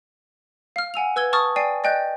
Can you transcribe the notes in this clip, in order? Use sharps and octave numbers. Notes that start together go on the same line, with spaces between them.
F5 F6
F#5 G#5 E6 F7
B4 E6 G#6 G7
A5 C#6 D#6 F6 A6
D5 G5 G#5 C7 D#7
D5 D#5 G5 F#6 G6